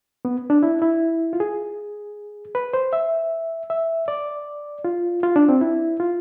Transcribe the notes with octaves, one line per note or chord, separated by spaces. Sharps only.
B3
D4
E4
E4
F4
G#4
B4
C5
E5
E5
D5
F4
F4
D4
C4
E4
F4